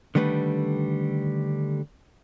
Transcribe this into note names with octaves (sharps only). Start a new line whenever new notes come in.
D3 D#3 G3 A3 B4